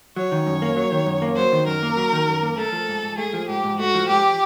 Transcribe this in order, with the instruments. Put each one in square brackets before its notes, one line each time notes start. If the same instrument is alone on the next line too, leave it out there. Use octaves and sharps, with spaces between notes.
[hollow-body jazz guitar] F#3 [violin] C#5
[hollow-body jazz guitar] D#3
F#2
A#3
F#3
D#3
F#2
A#3
[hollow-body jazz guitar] F#3 [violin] C5
[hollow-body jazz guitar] D#3
[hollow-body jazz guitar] F#2 [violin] A#4
[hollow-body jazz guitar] A#3
F#3
D#3
F#2
A#3
[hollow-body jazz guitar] A3 [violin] A4
[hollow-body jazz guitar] F3
G#2
G#2
[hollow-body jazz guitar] A3 [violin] G#4
[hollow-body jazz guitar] F3
[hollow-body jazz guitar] G#2 [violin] G4
[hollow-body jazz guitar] G#2
[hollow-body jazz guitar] A3 [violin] F#4
[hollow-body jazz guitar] F3
[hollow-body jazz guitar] G#2 [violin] G4